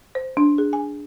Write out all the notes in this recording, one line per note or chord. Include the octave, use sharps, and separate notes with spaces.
C5
D4
G#4
G#5